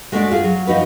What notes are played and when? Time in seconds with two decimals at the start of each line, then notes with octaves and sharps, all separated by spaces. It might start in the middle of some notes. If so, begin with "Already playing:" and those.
0.12 G#3 A3 B3 D4 F#4 D5
0.31 F4 G#4
0.44 F#3
0.67 F3 D#4 F#4 B4